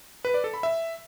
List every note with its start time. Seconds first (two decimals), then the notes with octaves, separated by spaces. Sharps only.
0.25 B4
0.34 D5
0.44 A4
0.54 B5
0.63 E5